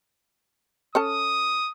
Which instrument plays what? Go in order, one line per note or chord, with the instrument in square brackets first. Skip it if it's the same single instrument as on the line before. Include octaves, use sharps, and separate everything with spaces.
[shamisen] C#4 A4 A5 [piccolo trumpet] D#6